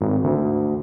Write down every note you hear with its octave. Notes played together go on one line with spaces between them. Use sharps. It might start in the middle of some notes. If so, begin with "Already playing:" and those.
G#1
D2